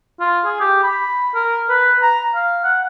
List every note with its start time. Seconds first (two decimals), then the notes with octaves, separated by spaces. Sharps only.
0.20 F4
0.45 G#4
0.60 G4
0.83 B5
1.35 A#4
1.69 B4
2.02 A#5
2.35 F5
2.64 F#5